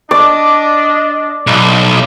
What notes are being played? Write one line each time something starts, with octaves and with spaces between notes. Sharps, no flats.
D4 D5 D#5
B1